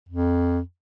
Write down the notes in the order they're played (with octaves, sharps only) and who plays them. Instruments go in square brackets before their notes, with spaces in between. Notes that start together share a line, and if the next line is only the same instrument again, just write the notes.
[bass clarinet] F2